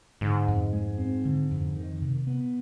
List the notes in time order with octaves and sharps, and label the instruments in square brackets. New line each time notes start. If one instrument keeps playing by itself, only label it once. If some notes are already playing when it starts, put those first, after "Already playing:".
[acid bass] G#2 [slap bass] D3
[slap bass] F2
G#3
C4
D3
F2
D#3
C3
B3